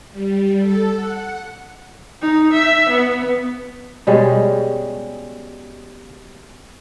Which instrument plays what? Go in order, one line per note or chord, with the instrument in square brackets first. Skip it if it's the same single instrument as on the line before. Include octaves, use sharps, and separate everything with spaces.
[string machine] G3
A4
F#5
[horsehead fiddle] D#4
E5
B3
[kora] B2 G3 G#3 C#4